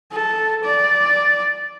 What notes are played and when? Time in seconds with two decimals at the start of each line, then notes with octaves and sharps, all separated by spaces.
0.12 A4
0.64 D5